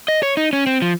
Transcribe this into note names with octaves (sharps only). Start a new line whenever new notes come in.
D#5
C#5
D#4
C#4
C4
F3